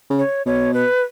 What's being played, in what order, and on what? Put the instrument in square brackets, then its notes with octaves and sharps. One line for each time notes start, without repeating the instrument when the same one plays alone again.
[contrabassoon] C#3
[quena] C#5
[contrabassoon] B2 [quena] C#5
[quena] B4